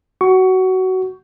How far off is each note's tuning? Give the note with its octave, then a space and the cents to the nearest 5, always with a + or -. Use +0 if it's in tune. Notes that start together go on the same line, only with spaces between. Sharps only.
F#4 +15 C#6 +20